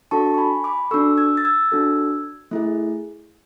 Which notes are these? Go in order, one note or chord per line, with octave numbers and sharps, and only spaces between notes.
D4 F#4 A4 A5 C#6
C#6
G#5 B5
B5 D6
D4 F#4 A4 C#6 E6
E6 G#6
A6
E6 G#6
D4 F#4 A4
A3 E4 G#4